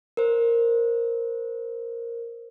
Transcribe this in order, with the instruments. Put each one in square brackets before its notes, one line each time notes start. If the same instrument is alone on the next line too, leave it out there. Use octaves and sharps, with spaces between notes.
[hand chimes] A#4 C5